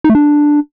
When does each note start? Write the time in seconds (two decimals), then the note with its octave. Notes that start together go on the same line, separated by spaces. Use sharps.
0.04 D#4
0.10 A3
0.15 D4